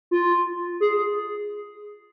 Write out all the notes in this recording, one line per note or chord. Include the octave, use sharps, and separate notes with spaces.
F4
G#4